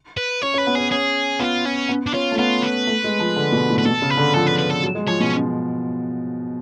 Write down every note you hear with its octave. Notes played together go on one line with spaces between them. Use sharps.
B4
C#4 C#5
C#4
B4
B3
C#4 G#4
C#4 G#4
B3 F4
C#4
B3
D4
C#4 F4
A3
B3 F4
B4
A3
G#3
F3
D3
B2
A2
B4
B2 A4
C#3
B4
D3
F3 A4
B4
B4
A4
F#3
G#3
F3 C#5
B2 C#4